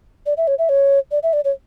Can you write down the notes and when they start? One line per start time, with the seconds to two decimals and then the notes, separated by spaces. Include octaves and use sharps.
0.26 D5
0.37 E5
0.47 C#5
0.59 E5
0.69 C#5
1.11 D5
1.23 E5
1.33 D5
1.45 C#5